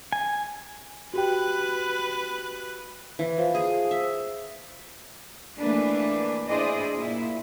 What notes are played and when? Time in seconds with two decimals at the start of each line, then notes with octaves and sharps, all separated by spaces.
0.13 G#5
1.14 F#4 G4 B4 G5 F#6
3.19 E3
3.38 F3
3.55 G#4
3.91 E5
5.58 E3 A3 A#3 D4 B4
6.48 D4 E4 G#4 C5 D5 D#5
6.96 A#2 E4